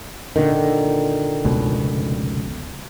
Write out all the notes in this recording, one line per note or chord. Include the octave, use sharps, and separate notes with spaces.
A#2 D3 D#3
F1 C#2 B2